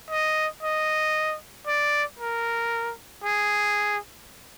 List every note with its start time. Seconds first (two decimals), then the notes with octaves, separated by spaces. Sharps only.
0.10 D#5
0.63 D#5
1.67 D5
2.19 A#4
3.24 G#4